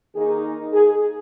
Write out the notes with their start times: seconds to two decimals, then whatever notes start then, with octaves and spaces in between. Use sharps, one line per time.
0.15 D#3 A#3 D#4 G#4
0.73 G#4